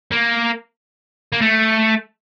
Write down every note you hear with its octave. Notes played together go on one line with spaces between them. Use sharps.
A#3
A#3
A3